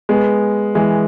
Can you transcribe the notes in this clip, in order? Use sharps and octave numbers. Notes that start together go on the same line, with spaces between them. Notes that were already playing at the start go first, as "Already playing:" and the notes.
G#3 B3
E3 G#3